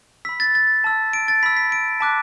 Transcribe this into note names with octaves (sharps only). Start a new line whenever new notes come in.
B5 E6 B6
A6
A6
A5 E6
D7
A6
B5 E6 B6
B6
D7
A5 D6 F#6 B6